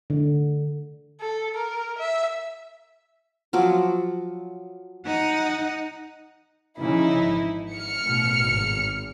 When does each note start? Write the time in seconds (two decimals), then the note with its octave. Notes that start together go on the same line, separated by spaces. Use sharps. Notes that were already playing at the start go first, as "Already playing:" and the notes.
0.10 D3
1.20 A4
1.54 A#4
1.98 E5
3.53 F3 F#3 D6
5.06 D#4 F#5
6.78 C#3 E3 F3 D#4 E4
7.20 G#1
7.74 F6 C#7
8.04 A1 B2
8.38 G#1